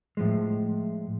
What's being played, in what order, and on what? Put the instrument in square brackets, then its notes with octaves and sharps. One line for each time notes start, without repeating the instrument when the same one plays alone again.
[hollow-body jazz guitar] A2 F3 G#3